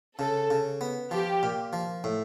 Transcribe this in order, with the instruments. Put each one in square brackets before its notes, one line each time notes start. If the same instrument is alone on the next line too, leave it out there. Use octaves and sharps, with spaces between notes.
[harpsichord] C#3 [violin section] A4
[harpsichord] C#3
B3
[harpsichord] F3 [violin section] G4
[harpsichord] A#2
F3
A2